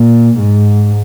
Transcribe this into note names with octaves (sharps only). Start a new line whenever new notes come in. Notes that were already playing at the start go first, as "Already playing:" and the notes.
Already playing: A#2
G#2